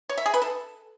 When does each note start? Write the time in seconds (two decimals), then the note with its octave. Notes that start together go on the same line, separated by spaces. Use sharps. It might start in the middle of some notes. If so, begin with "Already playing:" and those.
0.09 C#5
0.18 E5
0.26 G#4
0.34 B4
0.42 A4